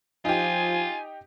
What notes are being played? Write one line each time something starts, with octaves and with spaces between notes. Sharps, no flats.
F3 D#4 F4 G4 G#5